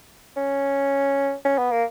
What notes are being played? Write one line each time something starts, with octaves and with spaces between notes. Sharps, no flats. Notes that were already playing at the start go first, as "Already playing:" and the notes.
C#4
C#4
B3
A#3